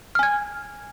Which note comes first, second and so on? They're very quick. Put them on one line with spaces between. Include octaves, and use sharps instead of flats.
F6 G#5 G#6